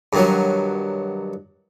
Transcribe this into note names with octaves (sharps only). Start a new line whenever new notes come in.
G2 D#3 F#3